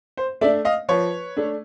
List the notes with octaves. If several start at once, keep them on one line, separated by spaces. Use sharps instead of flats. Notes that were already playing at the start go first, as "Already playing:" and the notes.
C5
A3 D4 D5 E5
D#5 F5
F3 B4 C#5
A3 D4